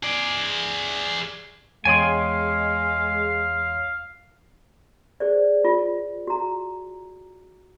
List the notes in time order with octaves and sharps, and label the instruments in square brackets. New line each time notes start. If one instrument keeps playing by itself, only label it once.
[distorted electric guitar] G#4 D5
[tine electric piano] E2 C#5 C6 [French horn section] G#3 [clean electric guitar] G#4 G5 G#5 [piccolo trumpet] F5
[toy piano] G#4 C5 D5
F4
F#4 A#5